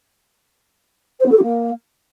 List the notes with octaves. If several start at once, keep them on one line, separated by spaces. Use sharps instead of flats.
C5
B3
A4
G4
A#3